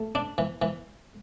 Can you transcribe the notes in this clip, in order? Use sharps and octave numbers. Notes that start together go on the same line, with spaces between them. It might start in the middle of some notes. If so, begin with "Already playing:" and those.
Already playing: A3
D4
E3
E3